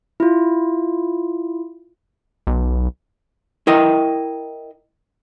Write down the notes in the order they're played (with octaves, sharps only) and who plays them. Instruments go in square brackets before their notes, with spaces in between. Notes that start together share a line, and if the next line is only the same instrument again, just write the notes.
[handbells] E4 F4
[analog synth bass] B1
[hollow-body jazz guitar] E4 A#4 D#5 G5